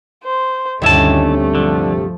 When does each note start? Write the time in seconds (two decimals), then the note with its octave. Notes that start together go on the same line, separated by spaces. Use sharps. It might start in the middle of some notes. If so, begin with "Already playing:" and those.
0.24 C5
0.82 D2 G2 C3 D#3 A3 C#4 E4 A5
1.55 D3 F3